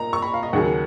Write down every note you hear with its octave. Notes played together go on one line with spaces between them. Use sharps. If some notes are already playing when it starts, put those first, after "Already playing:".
Already playing: A#2 D#4 A#5
C#6
B5
F5
D#5
D#2 C#3 F#3 A#3 F#5